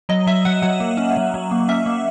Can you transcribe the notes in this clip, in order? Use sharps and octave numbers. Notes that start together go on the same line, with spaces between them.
F#3 D#5
F#3 E5
F#3 F#5
F#3 F#5
A#3
C#4
F#3
F#3
A#3
C#4 E5
A#3